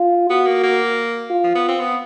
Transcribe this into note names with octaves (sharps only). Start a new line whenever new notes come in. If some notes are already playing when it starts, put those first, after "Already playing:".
Already playing: F4
B3 F#4
A#3
A#3
F4
F3
B3
C4
B3